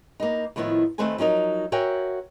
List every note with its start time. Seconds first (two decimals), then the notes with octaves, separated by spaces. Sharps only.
0.20 A#3 B3 D#4
0.56 A2 D#3 F3 B3 E4
0.98 D#3 A3 C4 B4 C5 G#5
1.18 F3 F#3 D#4 A#4
1.72 F#4 A#4 C#5 E5 G5 G#5